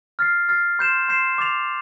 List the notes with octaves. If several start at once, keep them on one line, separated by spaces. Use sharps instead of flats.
F6 A6 C7
F6 A6 C7
C6 G6 C7 E7
C6 G6 C7 E7
D6 A6 C7 F7